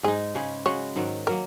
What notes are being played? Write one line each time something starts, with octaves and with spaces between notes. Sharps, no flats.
G#2 G#3 D#4 G#4
C#3 G#3 C#4
C#3 G#3 F#4 C#5
G#2 D#3 F#3
F#3 A#3 A#4